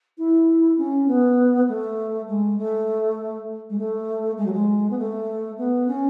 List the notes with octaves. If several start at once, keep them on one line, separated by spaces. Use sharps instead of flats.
E4
C#4
B3
A3
G#3
A3
G#3
A3
G#3
F#3
G#3
B3
A3
B3
C#4